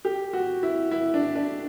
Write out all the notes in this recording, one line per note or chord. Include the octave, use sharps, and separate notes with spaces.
G4
F#4
E4
E4
D4
D4